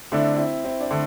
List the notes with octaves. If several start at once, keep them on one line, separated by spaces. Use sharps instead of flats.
D3 A3 C4 D4 E4
C4 E4
C4 E4
D4
D3 A3